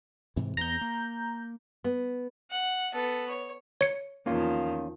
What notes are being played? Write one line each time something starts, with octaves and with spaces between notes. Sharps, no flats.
G#2 C3 E3
E2 B3 A#5 G6
A#3
B3
F#5
B3 A4
C#5
C#5 C#7
E2 D#3 F3 A#3 C#4 F4